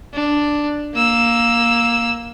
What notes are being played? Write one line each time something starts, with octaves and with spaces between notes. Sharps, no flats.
D4
A#3 E6